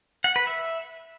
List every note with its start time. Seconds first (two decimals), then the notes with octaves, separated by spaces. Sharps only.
0.24 F#5
0.36 B4
0.47 E5